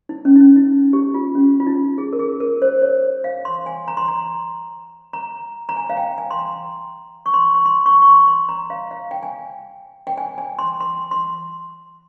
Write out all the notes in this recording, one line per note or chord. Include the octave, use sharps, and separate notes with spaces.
D#4
C#4
D#4
C#4
D#4
G4
F4
C#4
F4
D#4
G#4
A#4
G#4
A#4
C5
C#5
F5
C6
G#5
A#5
C6
A#5
A#5
A#5
G#5
F5
G5
G#5
C6
A#5
C#6
C6
C#6
C6
C#6
C#6
C6
C6
A#5
F5
F5
G5
G#5
G5
G#5
G#5
C6
C6
C6